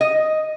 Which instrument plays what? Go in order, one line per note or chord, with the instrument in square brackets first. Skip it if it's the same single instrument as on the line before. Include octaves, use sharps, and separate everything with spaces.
[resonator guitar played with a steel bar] D#5